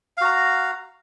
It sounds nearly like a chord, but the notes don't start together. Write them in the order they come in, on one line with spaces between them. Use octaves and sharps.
F5 F#4 A#5